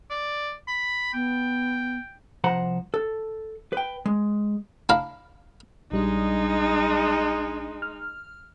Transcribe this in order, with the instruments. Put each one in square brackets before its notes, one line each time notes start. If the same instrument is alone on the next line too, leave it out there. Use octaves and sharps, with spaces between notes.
[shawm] D5
B5
[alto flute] B3 [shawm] G5
[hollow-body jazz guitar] C2 F3 C5 F#5 A#5
A4
B4 G5
G#3
[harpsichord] D4 E4 F5 A#5
[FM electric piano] A#1 G3 D4 [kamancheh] G#3 D#4
[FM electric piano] F6